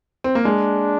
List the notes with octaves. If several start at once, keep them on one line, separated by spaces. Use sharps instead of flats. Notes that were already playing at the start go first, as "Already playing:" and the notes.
C4
A#3
G#3 D4